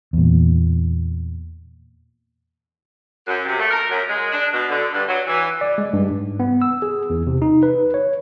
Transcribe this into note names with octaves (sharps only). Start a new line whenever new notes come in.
E2 A#2
F#2
C3
A3
A#4
F#2
G#3
D4
B2
D3
G2
F#3
E3
D5
G#3
G2
G#2
B3
E6
G#4
E2
C3
D#4
B4
C#5